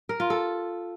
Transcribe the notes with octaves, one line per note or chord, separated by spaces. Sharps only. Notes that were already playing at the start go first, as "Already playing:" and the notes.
A#4
F4
A4